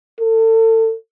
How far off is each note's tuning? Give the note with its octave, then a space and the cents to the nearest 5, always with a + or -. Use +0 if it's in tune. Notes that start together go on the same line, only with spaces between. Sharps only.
A4 +35